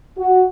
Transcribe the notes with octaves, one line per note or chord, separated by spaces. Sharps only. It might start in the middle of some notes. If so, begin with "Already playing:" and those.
F#4